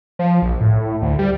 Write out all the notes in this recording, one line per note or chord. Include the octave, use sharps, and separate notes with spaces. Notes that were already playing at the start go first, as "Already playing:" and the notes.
F3
A#1
A2
D2
G3